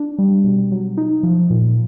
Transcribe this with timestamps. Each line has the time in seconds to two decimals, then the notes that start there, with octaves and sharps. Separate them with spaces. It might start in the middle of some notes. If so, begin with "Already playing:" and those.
Already playing: D4
0.18 G3
0.44 B2
0.71 F#3
0.97 D#4
1.23 F3
1.50 A#2